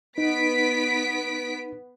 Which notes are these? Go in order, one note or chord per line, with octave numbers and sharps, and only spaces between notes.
B3 D#4 B6 D7